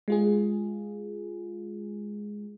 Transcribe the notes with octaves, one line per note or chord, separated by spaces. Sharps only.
G#3 F4 G#4